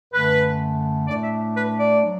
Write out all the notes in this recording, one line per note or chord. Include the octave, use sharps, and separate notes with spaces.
F#2 D3 A3 B4
A2 A3 D4 D5
E5
B4
D5
F#3 D4